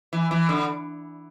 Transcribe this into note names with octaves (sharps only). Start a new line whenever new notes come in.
E3
E3
D3